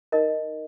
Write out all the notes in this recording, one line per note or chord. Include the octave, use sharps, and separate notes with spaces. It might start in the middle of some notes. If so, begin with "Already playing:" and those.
D#4 A#4 D#5